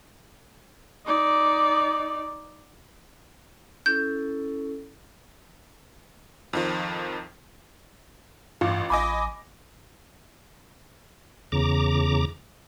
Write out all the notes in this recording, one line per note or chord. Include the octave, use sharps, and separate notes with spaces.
D#4 D5
C#4 E4 A4 G6
F2 D#3 F3
A1 G2 F4 D6
A1 D#5 G#5 B5 D6
E2 C#3 A#5 D6